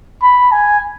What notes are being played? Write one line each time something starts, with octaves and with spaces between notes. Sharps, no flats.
B5
G#5